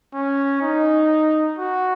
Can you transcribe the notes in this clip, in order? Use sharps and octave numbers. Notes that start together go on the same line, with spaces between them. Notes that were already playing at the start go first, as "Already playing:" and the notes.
C#4
D#4
F#4